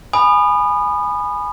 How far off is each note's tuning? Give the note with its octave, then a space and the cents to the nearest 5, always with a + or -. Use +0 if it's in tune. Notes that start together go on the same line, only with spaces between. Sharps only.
G#5 +0 B5 +0 D#6 -30